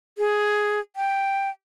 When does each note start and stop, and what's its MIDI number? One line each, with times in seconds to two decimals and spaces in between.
0.18 0.79 68
0.96 1.50 79